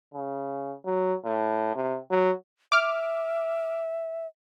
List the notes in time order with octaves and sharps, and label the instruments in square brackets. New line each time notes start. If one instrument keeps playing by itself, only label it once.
[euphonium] C#3
F#3
A2
C3
F#3
[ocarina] E5 [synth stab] D6 F6